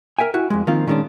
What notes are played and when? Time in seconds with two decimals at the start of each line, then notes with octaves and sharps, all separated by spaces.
0.19 A#4 E5 G5 G#5
0.34 E4 F#4
0.50 F2 G#3
0.67 D#3 F3 A#3 C4 F4
0.87 A#2 D#3 G3 G#3 C#4 D4